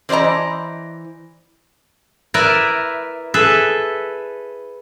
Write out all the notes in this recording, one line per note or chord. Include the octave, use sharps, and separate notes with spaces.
E3 C5 D5 D#5 A#5
E4 A#4 B4 D5 E5
G#4 A4 B4 E5